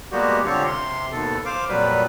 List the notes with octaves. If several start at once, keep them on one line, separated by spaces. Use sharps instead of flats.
G3 G#3 A#3 B3 F#4 G4
D3 C4 F4 G4 C#5
C3 C6
D#2 B2 A4
C5 F5 D6
F2 A#2 F#3 G3 B4